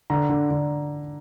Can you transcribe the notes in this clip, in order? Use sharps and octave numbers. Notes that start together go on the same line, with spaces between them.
D3 A#5
D3
D3